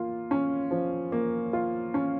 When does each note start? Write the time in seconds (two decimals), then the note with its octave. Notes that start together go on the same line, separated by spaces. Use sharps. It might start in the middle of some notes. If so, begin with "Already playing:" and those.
Already playing: A#3 F4
0.31 C#4
0.71 F3
1.12 A#3
1.53 F4
1.94 C#4